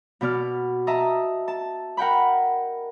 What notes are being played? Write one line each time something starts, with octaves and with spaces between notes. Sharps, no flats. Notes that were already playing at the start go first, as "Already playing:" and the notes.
B2 B3 D5 F6
D#5 E5 A5 A#5
A5
A#4 F#5 G5 B5